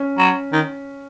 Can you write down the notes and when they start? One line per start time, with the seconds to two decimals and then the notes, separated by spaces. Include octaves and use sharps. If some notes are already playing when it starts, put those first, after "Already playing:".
Already playing: C#4
0.18 F#3
0.52 D#3